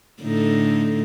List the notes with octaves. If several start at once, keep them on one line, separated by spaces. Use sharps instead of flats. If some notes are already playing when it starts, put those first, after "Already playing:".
A2 D3 D#4